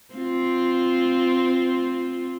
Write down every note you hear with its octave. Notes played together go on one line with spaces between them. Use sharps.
C4 F4